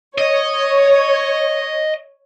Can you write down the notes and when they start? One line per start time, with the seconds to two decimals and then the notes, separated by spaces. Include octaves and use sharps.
0.18 C#5 D#5